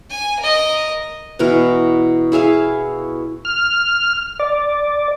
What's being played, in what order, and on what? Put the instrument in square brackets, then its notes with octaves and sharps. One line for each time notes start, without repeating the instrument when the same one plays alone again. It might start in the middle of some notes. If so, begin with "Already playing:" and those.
[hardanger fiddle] G#5
A#4 D#5
[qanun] B2 E3 A#4
E4 G#4 E5 F5
[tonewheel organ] F6
D5